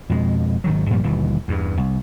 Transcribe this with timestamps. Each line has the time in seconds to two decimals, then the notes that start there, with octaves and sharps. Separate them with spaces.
0.09 F2 B2 G#3
0.64 G#1 D#3 F#3
0.91 G2 A#2 F3 G3
1.04 G1 D#2 B2 E3
1.48 E2 G2
1.77 C2